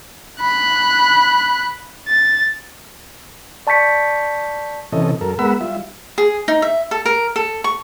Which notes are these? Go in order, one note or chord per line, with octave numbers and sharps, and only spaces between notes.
B5 F#6
A6
D5 A5 C#6 G6 B6 C#7
C3 E3 C#4 A4 D#5
F#2 A4 A#4
G#3 B3 A#4 F#5 B5 E6
G3 F4 E5
G#4
D#4
E5
A4
A#4
A4
C#6